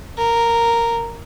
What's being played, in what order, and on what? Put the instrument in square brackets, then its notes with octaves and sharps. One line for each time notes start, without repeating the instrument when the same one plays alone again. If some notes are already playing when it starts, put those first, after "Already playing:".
[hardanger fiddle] A#4